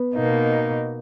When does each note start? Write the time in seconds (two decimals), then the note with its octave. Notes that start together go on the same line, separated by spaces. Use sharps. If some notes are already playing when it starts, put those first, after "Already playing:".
Already playing: B3
0.14 B2 A#3 D#4